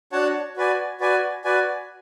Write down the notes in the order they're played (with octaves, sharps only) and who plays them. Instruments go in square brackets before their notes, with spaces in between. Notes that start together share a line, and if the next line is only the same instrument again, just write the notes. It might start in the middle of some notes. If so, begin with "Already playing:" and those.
[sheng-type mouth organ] D4 F#4 C#5 F#5 A5
F#4 B4 D5 G#5
F#4 B4 D5 G#5
F#4 B4 D5 G#5